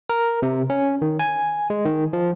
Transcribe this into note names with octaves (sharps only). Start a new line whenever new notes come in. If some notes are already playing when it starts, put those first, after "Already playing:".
A#4
C3
C#4
D#3
G#5
G#3
D#3
F3